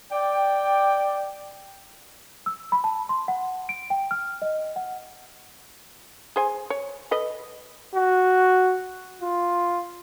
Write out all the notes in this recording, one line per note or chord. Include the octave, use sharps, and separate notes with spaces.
D5 G5
E6
B5
A5
C6
F#5
D7
G5
F6
D#5
F#5
G#4 C5 G#5
C#5
A4 B4 D#5
F#4
F4